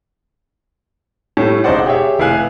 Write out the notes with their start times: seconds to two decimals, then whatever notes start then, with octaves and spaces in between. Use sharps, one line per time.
1.37 A2 G3 A3
1.64 E1 C#3 D#4 C5 D5 F#5
1.86 G4 G#4 C#5 E5
2.19 F1 E4 B4 F5 G#5 F#6